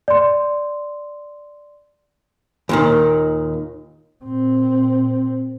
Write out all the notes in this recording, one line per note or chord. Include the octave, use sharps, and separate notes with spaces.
D5 C6
D#2 A#2 D#3
A#2 C4